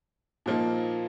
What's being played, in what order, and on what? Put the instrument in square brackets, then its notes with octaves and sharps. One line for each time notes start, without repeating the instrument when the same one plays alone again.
[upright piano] A#2 F3 A#3 D#4